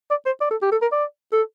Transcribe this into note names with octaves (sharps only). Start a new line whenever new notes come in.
D5
C5
D5
A4
G4
A4
A#4
D5
A4